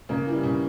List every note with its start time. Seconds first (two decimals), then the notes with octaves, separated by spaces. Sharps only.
0.09 C#3 A#3
0.26 E3 G3
0.43 C#3